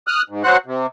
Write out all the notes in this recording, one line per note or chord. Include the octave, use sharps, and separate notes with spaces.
D#6 F6 F#6
G#2
F#3 F#4 C5 F#5 F#6
C3